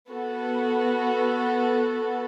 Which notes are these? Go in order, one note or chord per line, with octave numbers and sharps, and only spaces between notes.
B3 F#4 A4